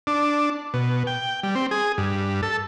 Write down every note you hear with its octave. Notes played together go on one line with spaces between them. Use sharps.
D4
B2
G5
G3
C4
G#4
G2
A4